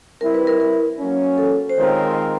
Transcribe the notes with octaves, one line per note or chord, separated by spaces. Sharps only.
G3 C4 E4 A#4
B4
A#4
A#4
F#3 A#3 C#4
A4
C5
D#3 G#3 C4 F4 A#4 C#5